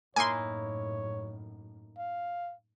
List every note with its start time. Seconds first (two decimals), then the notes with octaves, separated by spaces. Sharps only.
0.16 F#2 A2 A#3 D#4 E4 C#5 G#5 C6
1.98 F5